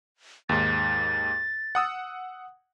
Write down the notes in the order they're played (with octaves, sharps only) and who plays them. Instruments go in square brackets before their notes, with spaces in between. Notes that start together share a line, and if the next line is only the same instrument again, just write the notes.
[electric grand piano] D#2 G#2 [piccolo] A6
[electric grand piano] F#5 D#6 E6